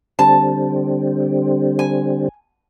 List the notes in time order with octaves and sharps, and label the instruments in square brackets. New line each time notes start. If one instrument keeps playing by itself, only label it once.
[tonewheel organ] D3 G3 C4 [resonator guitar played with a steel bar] A5
[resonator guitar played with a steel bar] G#5